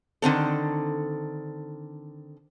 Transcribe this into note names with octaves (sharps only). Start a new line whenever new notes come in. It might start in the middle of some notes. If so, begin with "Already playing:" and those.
D3 D#3 C4 A4